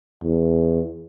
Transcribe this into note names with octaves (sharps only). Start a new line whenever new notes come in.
E2